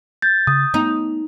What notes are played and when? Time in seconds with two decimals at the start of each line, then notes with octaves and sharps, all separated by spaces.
0.22 G6 A6
0.47 C#3 D#6
0.74 A3 B3 D#4